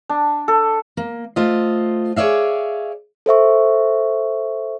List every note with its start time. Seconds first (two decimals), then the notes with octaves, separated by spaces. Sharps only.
0.09 D4
0.48 A4
0.97 A#3
1.36 A3 F4 C5 D#5
2.16 G#4 C#5 D5 E5 F5
3.26 A4 C5 E5 C#6